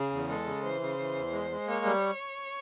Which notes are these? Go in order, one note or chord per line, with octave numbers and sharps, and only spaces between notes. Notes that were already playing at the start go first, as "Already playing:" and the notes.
Already playing: C#3 G#4
E2
G#3 A4
C#3
E3 C5
C#3
E3
E2
G#3
G#3
A#3 C#5
G3